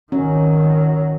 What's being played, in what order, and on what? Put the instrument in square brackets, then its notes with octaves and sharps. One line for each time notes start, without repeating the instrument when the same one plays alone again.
[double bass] G#1 D#3 [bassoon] F#3 [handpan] C#4